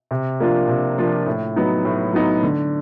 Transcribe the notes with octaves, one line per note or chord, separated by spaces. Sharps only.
C3
F3 A#3 D4 F4
C3
F3 A#3 D4 F4
A2
F#3 B3 D#4
A2
F#3 B3 D#4
D3